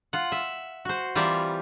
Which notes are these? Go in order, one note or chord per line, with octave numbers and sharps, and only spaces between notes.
F4 F#5
E5
F#4 C5
E3 G3 C4 F4 A#4